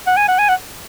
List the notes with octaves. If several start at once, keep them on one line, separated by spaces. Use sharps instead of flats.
F#5
G#5
F#5
G#5
F#5